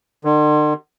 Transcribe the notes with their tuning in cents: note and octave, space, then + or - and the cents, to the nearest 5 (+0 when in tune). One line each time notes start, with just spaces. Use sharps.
D3 +45